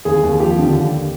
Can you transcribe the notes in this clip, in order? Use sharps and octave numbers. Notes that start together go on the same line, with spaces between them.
D#2 G#4
D#2
F3 G4
D3
D#2